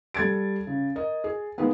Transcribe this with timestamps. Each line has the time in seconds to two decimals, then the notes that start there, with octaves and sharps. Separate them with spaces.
0.14 G3 A4 G#6 A6 D7
0.67 C#3
0.95 A#4 D#5
1.24 G#4
1.58 D#3 G#3 A#3 B3